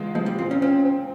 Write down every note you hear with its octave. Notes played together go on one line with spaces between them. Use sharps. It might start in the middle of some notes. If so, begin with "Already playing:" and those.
Already playing: E2 G#3 F4
F3 G#3
G3
A#2 C4
C#4
C4 C#4
C4